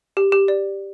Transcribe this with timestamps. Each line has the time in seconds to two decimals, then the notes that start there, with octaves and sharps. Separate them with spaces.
0.17 G4
0.32 G4
0.48 D5